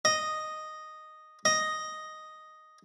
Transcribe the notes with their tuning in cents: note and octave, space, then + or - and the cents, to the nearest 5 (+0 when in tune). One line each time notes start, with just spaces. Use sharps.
D#5 -5
D#5 +0